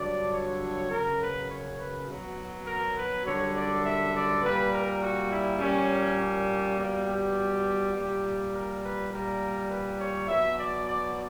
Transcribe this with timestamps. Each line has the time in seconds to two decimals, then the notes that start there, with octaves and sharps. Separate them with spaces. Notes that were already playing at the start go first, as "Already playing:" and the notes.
Already playing: G2 D3 F#3 D5
0.32 C#5
0.90 F#2 C#3 F#3 A#4
1.20 B4
1.49 C#5
1.78 B4
2.08 B2 F#3
2.66 A#4
2.96 B4
3.25 F#2 D3 G3 C#5
3.54 D5
3.84 E5
4.13 D5
4.42 A#2 G3 B4
4.71 A#4
5.01 F#4
5.30 E4
5.59 A#2 G3 C#4
6.18 C#4
6.76 B2 G3 A#3
7.06 G4
7.94 A#2 G3
8.52 A#4
8.81 B4
9.10 A#2 G3 A#4
9.69 B4
9.99 C#5
10.28 B2 F#3 E5
10.57 D5
10.86 D5